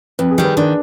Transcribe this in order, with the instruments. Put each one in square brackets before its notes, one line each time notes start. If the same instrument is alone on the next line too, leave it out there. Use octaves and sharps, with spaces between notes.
[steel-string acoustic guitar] F2 [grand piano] B4
[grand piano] G#4
[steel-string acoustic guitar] D#3 G3
[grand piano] B4
[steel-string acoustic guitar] D#3 [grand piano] D4